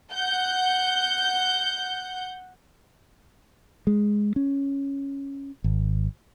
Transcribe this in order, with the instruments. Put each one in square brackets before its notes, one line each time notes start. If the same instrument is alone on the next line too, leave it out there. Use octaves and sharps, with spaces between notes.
[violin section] F#5 G6
[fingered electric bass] G#3
C#4
G#1